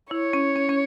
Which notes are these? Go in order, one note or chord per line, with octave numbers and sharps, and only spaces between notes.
E4 C#5
C#4
C#4
C#4